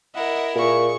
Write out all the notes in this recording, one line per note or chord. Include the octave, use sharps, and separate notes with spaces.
E4 A#4 D#5 F#5
A#2 G#4 C#6